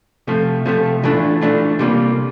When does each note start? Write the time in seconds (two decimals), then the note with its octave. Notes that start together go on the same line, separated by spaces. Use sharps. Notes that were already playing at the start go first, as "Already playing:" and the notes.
0.27 C3 F3 A3
0.66 C3 F3 A3
1.04 E3 A3 D4 F4
1.41 E3 A3 D4 F4
1.79 C3 G3 A#3 F4